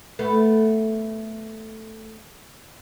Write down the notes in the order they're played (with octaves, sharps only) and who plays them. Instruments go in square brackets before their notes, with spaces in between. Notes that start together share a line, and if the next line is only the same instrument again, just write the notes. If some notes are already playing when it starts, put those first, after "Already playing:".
[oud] A3 B3